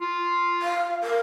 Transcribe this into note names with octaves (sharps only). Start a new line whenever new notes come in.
F4
F5
A#4